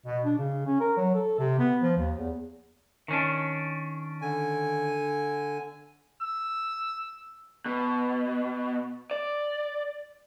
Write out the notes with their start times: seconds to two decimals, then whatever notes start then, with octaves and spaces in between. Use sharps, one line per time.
0.06 B2
0.25 D4
0.38 C#3
0.66 C#4
0.81 A#4
0.97 F#3
1.15 A4
1.39 C3
1.59 B3
1.81 F3
1.97 D#2
2.19 E2
3.08 D#3 C#4 D4
4.22 D3 G#5
6.21 E6
7.66 B2
9.11 D5